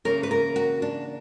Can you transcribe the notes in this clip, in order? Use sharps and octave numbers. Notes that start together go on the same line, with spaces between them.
C#3 E3 A#3 C#4 A#4
B4
A#4
F#4
D4